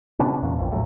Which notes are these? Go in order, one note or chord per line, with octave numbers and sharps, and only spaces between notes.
C3 B3 C#4 D4
E2 A#2
A#1 F2
A#1 A2 F3 F#3